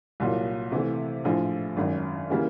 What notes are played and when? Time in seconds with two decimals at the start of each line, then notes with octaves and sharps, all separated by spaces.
0.20 C2 A#2 F#3
0.72 C3 E3 A3
1.24 A#1 A2 F3
1.76 G#1 F#2 D#3
2.30 C#3 E3 G3 A#3